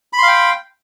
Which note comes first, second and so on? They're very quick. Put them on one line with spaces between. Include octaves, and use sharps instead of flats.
B5 C6 F5 G5